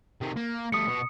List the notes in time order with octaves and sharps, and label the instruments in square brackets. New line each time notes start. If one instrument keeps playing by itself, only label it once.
[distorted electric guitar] C3 D#3
A#3
[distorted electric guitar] G3 A3 [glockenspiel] D#6 C#7
[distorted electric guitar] B2